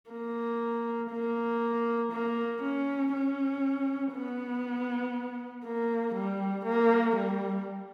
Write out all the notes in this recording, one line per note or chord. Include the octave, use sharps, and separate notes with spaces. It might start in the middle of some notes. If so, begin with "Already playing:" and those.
A#3
A#3
A#3
C#4
C#4
B3
A#3
G3
A#3
G3